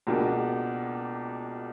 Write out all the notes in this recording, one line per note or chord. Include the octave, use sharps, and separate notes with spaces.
C#2 B2 A#3 D4 G4